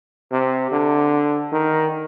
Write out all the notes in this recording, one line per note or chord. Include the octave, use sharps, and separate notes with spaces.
C3
D3
D#3